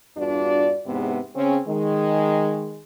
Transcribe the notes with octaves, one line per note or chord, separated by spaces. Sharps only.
E2 G2 D4 F4 F#4 D5
E2 G#2 C3 G#3 B3
C#3 C4 C#4
D#3 G#3